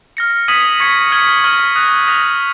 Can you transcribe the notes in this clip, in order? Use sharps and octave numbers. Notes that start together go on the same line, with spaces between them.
F6 A#6 C#7
D#6 G#6 B6 D#7 F#7
C#6 G#6 C#7
F6 G#6 C#7 F#7
C#6 F6 G#6 D#7 F#7
D#6 F#6 A#6 D#7
D#6 F#6 A#6 F7